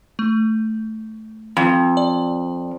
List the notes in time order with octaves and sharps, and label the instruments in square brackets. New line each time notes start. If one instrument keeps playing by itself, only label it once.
[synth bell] A3
[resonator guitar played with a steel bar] F2
[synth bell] D5